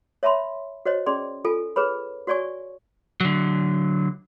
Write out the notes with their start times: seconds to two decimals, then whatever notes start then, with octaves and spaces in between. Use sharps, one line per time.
0.23 C#5 E5 A5 B5 C6
0.86 F#4 C5 C#5 D#5
1.06 C#4 G#4 D5 C6
1.45 F4 A4 G#5
1.76 G#4 B4 C#5 B5
2.27 F#4 C#5 D5 G#5 C#6
3.20 D3 F#3